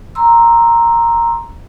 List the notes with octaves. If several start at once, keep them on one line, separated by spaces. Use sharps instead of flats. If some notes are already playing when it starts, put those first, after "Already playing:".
A#5 C6 E6